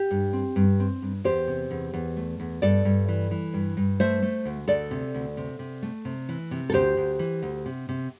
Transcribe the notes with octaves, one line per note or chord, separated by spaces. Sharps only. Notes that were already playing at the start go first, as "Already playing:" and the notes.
Already playing: G4
G2
C4
G2
C4
G2
E2 G4 C5
C3
E2
E2
A3
E2
G2 A4 D5
G2
E3
E3
G2
G2
A3 C5 E5
A3
D2
D2 A4 D5
C3
D2
C3
C3
A3
C3
E3
C3
A4
D2 G4 C5
D2
E3
D2
C3
C3